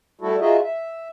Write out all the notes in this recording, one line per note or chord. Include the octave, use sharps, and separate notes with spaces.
G3 A3 E4 F#4 A4
D#4 F4 F#4 G#4 D#5 E5
E5